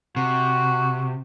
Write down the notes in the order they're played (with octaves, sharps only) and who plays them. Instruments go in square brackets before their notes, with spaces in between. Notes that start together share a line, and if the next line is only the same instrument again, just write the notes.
[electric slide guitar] C3 [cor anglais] F#4